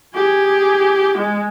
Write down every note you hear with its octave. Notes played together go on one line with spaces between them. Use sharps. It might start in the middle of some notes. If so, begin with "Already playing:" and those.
G4 G#4
G#3